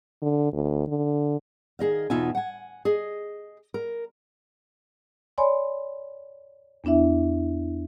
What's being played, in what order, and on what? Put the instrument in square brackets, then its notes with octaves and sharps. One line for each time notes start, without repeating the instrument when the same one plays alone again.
[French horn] D3
D2
D3
[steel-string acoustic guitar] D#3 G#4 D#5 F5
E2 B2 D#4 F4 E5 G#5
F#5 G#5
G#4 D#5
A#4
[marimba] C#5 D5 G#5 B5 C6
E2 B3 D4 E4 E5